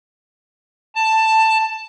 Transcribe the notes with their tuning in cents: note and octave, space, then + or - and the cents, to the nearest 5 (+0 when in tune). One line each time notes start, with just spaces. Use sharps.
A5 +10